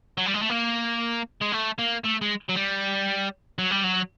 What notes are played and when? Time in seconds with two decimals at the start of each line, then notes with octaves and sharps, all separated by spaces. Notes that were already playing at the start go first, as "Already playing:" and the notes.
0.18 F#3
0.26 G3
0.34 G#3
0.42 A3
0.49 A#3
1.42 G#3
1.53 A3
1.78 A#3
2.04 A3
2.21 G#3
2.49 F#3
2.56 G3
3.58 F#3
3.71 G3
3.84 F#3